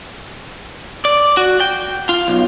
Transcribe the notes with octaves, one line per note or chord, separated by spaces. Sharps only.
D5
F#4
G5
F4
B1